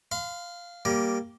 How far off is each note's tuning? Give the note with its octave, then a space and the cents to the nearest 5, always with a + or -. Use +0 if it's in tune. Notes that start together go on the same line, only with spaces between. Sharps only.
F5 +0 C6 -40
G3 -5 A#3 +0 A#5 +35